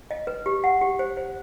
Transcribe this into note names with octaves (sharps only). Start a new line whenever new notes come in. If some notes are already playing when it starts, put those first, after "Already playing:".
D#5
B4
G4
F#5
G4
C5
C5